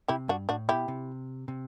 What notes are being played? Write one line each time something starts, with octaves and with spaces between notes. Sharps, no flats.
C3 E4 G4
G2 D4 F#4
A2 D4 F#4
B2 E4 G4
C3
C3